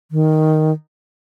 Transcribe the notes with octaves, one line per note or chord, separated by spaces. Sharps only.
D#3